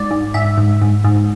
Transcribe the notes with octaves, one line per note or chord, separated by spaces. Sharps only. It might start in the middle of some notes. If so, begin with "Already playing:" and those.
Already playing: G#2 D5
G#2
G#2 E5
G#2
G#2
G#2